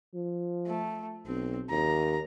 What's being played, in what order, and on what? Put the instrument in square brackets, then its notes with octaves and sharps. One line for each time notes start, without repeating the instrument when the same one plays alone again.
[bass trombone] F3
[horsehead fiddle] A3
[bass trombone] B1 [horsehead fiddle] C4
[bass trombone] D#2 [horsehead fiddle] A#5